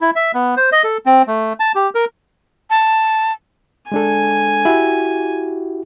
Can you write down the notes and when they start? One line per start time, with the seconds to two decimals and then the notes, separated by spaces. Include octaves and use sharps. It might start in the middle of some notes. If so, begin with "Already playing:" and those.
0.01 E4
0.16 E5
0.34 B3
0.57 C5
0.72 D#5
0.84 A4
1.06 C4
1.27 A3
1.60 A5
1.75 G4
1.95 A#4
2.70 A5
3.92 G#3 D4 A4 G#5
4.65 E4 F#4 G4